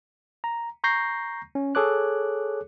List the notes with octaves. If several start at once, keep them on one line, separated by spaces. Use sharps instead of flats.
A#5
A#5 C#6 G6 A#6 C7
C#4
G#4 A4 C#5 D6 F#6